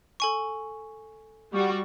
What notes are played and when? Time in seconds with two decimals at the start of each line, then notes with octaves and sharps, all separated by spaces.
0.20 A4 G#5 C#6
1.53 G3 F#4